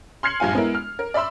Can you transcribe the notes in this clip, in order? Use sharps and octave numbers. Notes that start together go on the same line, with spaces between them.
C6 F6 G#6 C7 C#7 F#7
A#1 G2 F4 G#5
G#3 B3 E4 A#4
F6
A#4
D5 E5 B5 C6 E6